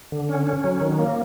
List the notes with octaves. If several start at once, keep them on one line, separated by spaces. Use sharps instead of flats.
D3
C#4
C#4
F#3
D#3
A#3